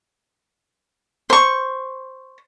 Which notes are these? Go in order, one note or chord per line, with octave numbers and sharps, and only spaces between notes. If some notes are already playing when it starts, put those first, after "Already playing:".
C5 C#6